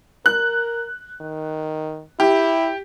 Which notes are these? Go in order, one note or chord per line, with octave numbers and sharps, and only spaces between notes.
A#4 F#6
D#3
E4 G4